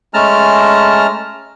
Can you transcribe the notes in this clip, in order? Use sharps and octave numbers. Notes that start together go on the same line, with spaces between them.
G#3 A3 C#4 A5 A#5 F6